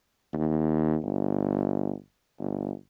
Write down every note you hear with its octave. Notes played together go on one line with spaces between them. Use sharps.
D#2
G1
G1